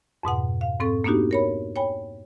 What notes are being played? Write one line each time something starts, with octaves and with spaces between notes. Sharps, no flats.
F2 G#2 B2 F#5
F5
G#2 C4 A4 C#6
A#3 B3 D4 D#4 F#4 G4
A#4 C#5 B5
C#5 G5 G#5 B5